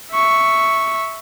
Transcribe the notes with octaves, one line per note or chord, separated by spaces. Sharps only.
E5 C#6